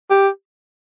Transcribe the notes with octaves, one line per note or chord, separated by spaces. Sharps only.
G4